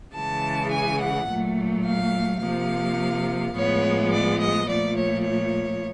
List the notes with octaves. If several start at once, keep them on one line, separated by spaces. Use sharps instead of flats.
C#3 E3 G#3 A5
G#5
F#5
A#2 F#3 A3
F5
C3 F3 A#3 F5
A2 F3 G#3 B3 C#5
D5
D#5
A#2 F3 A3 D5
C#5
C#5